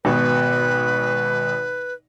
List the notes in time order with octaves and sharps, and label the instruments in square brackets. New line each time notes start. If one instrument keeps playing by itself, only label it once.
[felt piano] G#1 B2 [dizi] B4